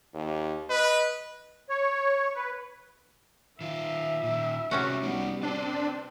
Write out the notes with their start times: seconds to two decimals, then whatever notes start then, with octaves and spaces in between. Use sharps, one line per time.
0.14 D#2
0.70 B4 D#5
1.69 C#5
2.35 B4
3.61 D#3 F4 E5
4.24 A#2 D#3
4.71 C3 G3 A3 C#4 F#4
5.03 G3 B3 D#4 C#5
5.43 C4 D4 B4 C5